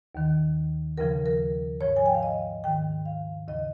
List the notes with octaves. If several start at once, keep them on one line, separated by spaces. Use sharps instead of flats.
D#2 D#3
D#2 C#3 F3 A#4
A#4
G#2 F3 C#5
G#5
G5
F5
D#5
G#2 D#3 G5
F5
D#2 C#3 F3 D#5